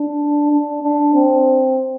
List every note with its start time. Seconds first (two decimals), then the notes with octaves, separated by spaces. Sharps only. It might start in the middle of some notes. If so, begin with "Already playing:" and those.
Already playing: D4
0.51 D4
0.82 D4
1.14 C4